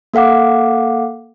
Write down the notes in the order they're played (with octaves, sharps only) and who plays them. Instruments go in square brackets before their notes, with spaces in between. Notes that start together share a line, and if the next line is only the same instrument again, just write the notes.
[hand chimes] A#3 A4 F5 F#5 D6